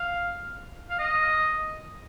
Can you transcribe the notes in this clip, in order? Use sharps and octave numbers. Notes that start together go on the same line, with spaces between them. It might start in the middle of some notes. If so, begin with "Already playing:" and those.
Already playing: F5
F5
D#5